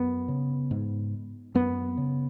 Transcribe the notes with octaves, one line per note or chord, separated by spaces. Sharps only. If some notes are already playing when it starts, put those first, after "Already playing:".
Already playing: F#2 B3
C#3
G#2
F#2 B3
C#3